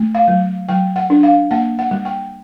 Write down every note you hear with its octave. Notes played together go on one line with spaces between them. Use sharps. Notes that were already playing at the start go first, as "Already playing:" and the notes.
Already playing: A3
F5
F#3
F#3 G5
F#5
D4
F5
A#3 F#5
F#5
G3
G5